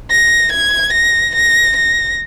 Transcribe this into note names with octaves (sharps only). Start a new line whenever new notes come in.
A#6
G#6
A#6
A#6
A#6